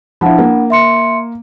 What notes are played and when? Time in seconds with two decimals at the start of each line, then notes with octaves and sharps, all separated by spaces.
0.21 F3 D4 E4 F#5 B5
0.39 A#3
0.70 E5 C6 C#7